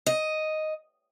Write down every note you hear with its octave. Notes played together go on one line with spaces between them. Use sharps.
D#5